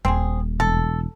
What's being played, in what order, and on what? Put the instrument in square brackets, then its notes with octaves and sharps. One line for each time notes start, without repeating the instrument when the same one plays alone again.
[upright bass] D#1 [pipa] C4 G#4
[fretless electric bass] E1 [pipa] A4